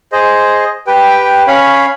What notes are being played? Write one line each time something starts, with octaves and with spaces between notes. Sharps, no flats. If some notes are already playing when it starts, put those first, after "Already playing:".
G#4 C5 D#5
G4 B4 G5
C#4 C#5 F5 B5